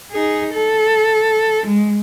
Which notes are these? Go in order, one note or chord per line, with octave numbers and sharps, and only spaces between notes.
D#4 G#4
A4
G#3